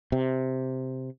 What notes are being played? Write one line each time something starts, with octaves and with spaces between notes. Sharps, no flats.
C3